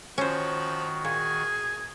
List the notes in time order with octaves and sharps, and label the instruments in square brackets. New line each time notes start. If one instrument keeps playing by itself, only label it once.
[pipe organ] D#3 F#4 [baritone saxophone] F3 [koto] C#4 C5
[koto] A#2 [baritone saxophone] G#4 [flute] G#6